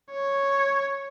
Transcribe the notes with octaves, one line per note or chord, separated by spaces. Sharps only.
C#5